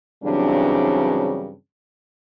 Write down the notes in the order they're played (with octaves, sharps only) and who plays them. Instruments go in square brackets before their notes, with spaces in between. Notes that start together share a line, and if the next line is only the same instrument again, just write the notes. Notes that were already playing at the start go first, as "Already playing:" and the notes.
[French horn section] G2 C#3 E3 F#3 C4 D4